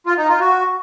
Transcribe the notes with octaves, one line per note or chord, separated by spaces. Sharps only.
F4
D#4
F4
F#4